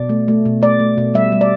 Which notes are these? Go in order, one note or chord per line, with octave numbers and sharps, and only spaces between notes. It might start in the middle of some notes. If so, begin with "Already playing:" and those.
Already playing: B2 D5
A3
A3
B2
A3 D5
A3
B2
G3 E5
G3
D5